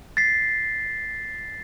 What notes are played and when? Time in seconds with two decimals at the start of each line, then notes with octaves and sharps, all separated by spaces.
0.17 A6 B6 C7